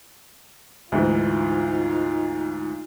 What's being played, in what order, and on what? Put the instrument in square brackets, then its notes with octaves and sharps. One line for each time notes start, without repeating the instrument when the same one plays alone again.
[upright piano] D2 G#2 E3 [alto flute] D#4 [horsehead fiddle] F4